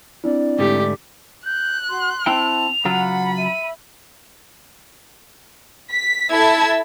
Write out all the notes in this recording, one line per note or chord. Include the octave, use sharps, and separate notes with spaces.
C4 D4 E4 D5
G#2 D3 A3 G4
F#6 G6
F#4 C6
C4 E4 G5 A5 F7
C#3 F#3 F4 F#5 B5
E5 D#7
B6
E4 A4 A5 E6 G#6